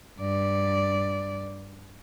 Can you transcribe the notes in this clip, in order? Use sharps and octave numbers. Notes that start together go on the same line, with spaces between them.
G2 D5